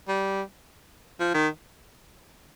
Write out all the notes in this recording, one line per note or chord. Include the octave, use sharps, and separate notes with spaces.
G3
F3
D#3